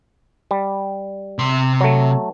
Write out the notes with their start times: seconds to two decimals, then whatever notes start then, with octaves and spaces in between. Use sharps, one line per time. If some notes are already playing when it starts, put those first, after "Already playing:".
0.51 G3
1.39 C3 C6
1.81 F#3 A3